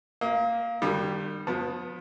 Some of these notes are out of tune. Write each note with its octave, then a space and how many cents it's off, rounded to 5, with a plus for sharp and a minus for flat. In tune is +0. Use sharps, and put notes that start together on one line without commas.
A#3 +0 D#5 +40
D#3 -40 G3 +0
F3 +35 B3 +0 A5 +0